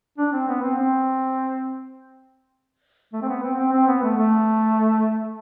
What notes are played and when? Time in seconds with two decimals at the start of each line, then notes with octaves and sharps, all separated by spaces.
0.18 D4
0.33 C4
0.48 B3
0.63 C4
0.77 C4
3.13 A3
3.22 C4
3.29 B3
3.43 C4
3.59 C4
3.72 C4
3.88 B3
4.02 A3
4.17 A3